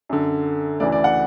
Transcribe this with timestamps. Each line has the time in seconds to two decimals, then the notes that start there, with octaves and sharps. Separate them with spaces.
0.10 F#2 D3
0.80 D2 C#3 E3 D5
0.92 D5
1.04 F#5